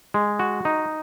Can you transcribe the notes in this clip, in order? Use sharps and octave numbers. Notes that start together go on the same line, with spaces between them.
G#3
F#4
D#4